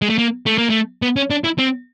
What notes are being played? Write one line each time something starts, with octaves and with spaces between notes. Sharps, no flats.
G#3
A3
A#3
A3
A#3
A3
B3
C#4
D4
E4
C4